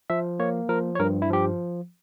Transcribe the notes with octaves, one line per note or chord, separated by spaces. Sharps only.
F3 E5
A#3 C#5
F3 A#4
C#5
G2 A#4
E4
F3 G4